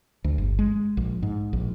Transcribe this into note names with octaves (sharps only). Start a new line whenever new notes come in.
D2
G1
G#3
A#1
G#2
A#1